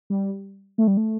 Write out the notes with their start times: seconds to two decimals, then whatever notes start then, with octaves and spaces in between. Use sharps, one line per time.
0.10 G3
0.78 A3
0.87 G3
0.97 A3